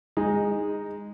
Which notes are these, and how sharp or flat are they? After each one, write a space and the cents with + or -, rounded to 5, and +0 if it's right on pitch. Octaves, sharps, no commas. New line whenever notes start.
G#3 -20 D#4 +0